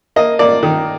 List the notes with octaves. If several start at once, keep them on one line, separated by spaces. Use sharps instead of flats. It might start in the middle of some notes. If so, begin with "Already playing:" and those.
A#3 D#5
A#3 D5
D#3